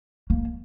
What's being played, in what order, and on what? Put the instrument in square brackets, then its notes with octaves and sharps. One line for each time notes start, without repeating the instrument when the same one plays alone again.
[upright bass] A#3